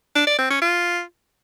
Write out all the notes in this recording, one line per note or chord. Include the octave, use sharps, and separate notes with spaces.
D4
D5
C4
C#4
F4